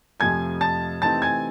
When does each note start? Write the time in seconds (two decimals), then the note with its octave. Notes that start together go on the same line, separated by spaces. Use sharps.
0.20 F2 C3 F3 A3 G#5 G#6
0.61 A5 A6
1.02 C3 E3 A3 C4 D#4 A5 A6
1.22 G#5 G#6